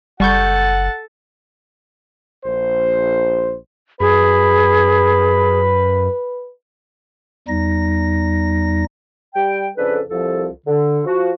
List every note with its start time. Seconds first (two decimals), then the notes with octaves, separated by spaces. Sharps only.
0.20 F#1 G3 A4 F#5 A5 C#6 G6
2.45 A#1 C5
4.00 F#2 G#4 B4 B5
7.48 E2 G3 D#4 A#6
9.35 G3 G5
9.77 F2 C#3 D4 A4 B4
10.10 C2 F3 A4
10.67 D3
11.06 F3 F#4